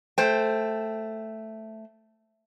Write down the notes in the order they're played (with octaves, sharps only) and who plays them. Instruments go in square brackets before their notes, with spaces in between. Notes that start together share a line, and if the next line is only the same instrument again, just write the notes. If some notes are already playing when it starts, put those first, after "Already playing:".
[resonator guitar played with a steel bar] A3 C5 G5